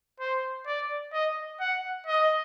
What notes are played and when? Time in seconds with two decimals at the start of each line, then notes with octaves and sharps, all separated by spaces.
0.20 C5
0.67 D5
1.13 D#5
1.60 F#5
2.07 D#5